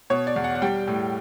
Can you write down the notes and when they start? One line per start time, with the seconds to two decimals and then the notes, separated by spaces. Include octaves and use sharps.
0.10 B2 C#5
0.27 D5
0.36 E2
0.44 F#5
0.55 F#5
0.62 G3 G5
0.87 A2